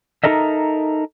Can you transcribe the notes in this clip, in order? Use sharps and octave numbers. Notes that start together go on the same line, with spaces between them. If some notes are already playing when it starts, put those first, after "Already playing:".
D#4 F#4 A4 A#4 D#5 E5